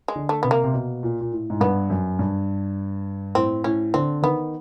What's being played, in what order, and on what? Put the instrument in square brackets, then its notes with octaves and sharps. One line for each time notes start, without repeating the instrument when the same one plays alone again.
[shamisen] G#3
[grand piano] D3
[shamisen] A3
[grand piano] C3 [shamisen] B3
[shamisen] A#3
[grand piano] C3
B2
A#2
A#2
A2
G#2
[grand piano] G2 [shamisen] B3
[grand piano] F#2
G2
[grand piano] A2 [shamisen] C4
[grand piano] A2 [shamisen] C#4
[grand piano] D3 [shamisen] C4
[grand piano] D#3 [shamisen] B3